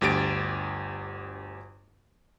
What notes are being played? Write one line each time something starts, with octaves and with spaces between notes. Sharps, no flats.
G1 D2 G4 A6 D7